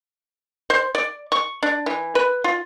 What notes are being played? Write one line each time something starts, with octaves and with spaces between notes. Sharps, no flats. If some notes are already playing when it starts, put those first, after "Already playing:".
C5
D5
C#6
D4
E3
B4
F4